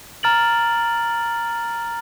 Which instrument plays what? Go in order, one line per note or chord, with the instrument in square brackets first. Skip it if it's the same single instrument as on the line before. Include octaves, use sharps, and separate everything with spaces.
[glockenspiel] A#5 F6 A6 D7 F#7